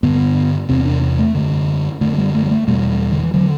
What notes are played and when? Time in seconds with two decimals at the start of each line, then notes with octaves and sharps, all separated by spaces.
0.03 G2 D3 B3
0.69 E2 C3 C4
0.85 D4
1.19 A3
1.35 F#2 D3
2.01 F#2 D3 A3
2.18 G3
2.35 A3
2.46 G3
2.51 A3
2.67 E2 B2 G3
3.12 D3
3.23 E3
3.34 D3 F#3